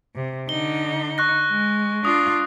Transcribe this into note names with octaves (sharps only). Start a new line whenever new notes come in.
C3
D3 D#4 G7
C#6 F#6 A#6
G#3
D4 F4 D#6